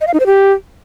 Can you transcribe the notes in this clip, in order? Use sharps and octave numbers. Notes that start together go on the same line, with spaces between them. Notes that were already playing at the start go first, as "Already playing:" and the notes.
D#5
F5
D#4
C5
G4